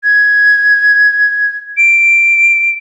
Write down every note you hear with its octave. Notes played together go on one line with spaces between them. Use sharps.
G#6
D7